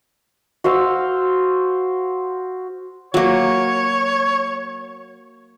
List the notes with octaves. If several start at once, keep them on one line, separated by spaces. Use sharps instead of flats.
F#4 C5 F5 E6
F#3 A#3 C#5